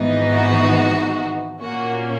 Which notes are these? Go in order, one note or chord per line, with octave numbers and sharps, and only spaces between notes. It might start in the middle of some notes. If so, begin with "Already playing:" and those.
Already playing: G#1 G#2 E3 B3 D#4
F#4
A#2 A#3 C#4 F#4